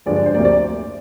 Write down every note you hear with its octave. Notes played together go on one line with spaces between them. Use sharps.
G2 D3 F3 G#3 D5
D5
C5
D2 C3 F3 A#3 D5
D5